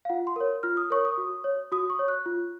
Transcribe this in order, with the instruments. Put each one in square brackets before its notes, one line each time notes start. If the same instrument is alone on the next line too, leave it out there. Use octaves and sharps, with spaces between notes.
[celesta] F5
F4 F#5
C6
A#4 C#5
F4 F6
D#6
A#4 C#5 C#6
D#6
F#4
C#5
F#4 D#6
C#6
C#5
F#6
F4